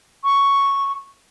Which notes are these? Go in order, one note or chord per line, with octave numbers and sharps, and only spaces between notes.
C#6